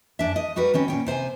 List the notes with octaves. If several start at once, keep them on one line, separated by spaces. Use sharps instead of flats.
F#2 D4 E5
D#5
G3 F#4 A#4 B4
D#3 C4 C#4
A#2 C#4 G5
C3 C5 F5 G#5